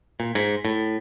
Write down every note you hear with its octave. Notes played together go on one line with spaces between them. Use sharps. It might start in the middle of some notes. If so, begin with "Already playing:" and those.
A#2
G#2
A2